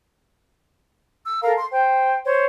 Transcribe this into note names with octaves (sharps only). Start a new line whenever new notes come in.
E6
A4 A#4 F5 A#5
C6
C5 G5
C5 C#5